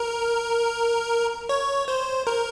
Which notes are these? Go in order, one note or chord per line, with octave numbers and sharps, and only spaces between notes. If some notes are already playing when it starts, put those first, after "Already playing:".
Already playing: A#4
C#5
C5
A#4